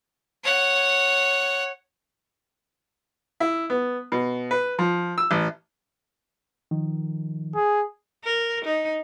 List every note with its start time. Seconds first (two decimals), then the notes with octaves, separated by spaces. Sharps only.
0.44 C#5 F#5
3.40 E4
3.70 B3
4.12 B2
4.51 B4
4.79 F3
5.18 E6
5.31 A1
6.71 D#3 F3
7.55 G#4
8.24 A#4
8.65 D#4